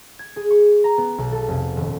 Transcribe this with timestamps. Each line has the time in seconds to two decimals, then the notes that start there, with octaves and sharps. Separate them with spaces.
0.19 G#6
0.36 G#4
0.51 C#6
0.84 A#5
0.98 B3
1.18 B1
1.32 A4
1.48 F1
1.77 D#1